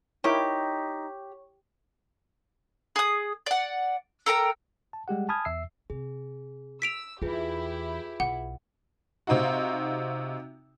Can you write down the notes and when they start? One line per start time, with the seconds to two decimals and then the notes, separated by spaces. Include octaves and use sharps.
0.24 D#4 E4 G4 A#4 C#5 G5 C#6
2.96 G#4 D#6
3.46 D5 F#5
4.26 A4 A#4 G5 A#5
4.93 A5
5.08 G3 G#3 G4 F#5
5.29 G#5 A5 B5 D#6 F6 G#6
5.45 E2 E5 E6 C7
5.90 C3 G#4
6.82 E6 B6 D7 F7
7.22 E2 E4 F4 G4 G#4 B4
8.20 B1 F#5
9.27 C3 C4 D#4 F4 F#4